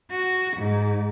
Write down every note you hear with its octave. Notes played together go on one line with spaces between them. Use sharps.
F#4
G#2